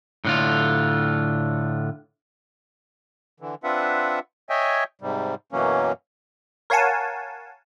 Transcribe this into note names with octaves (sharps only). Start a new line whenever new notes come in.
A2 D3 F4
D3 E3
C4 D4 F4 B4 E5 F#5
C#5 D#5 E5 G5 G#5
G#2 C3 G3
F#2 B2 E3 F#3 A#3 C#4
A#4 C#5 F5 F#5 G#5 A5